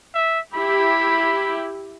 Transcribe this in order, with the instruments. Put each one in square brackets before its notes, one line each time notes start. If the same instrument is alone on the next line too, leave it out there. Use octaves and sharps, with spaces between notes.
[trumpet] E5
[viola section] E4 G4 [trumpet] B5